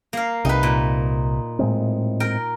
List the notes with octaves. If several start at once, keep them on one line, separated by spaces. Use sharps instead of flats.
A#3 F5
C2 C3 D#4 B4
A#2
A2 G#3 C4
A#4 G5